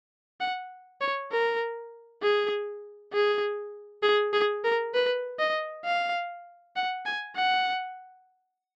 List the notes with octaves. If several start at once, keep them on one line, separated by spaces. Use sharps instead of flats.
F#5
C#5
A#4
G#4
G#4
G#4
G#4
A#4
B4
D#5
F5
F#5
G#5
F#5